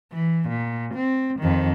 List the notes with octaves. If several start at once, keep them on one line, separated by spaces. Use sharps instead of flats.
E3
A#2
C4
F2 D#3